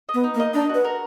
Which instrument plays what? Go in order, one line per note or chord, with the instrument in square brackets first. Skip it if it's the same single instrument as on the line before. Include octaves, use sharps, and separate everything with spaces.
[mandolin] D#5
[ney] B3
[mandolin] D#4
[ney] A#3
[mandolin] D#5
[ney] D4 [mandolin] D#4
[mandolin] F#4
[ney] B4
[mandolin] A#4